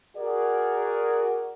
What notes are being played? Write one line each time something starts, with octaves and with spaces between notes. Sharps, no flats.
F#4 G#4 A#4 D5